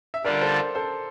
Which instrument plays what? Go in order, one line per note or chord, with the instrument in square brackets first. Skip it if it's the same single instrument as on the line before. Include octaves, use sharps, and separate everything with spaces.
[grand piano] E5
[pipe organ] D3 G3 D4 F4 [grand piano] A#4 D5
[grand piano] A4 C5
A4 C5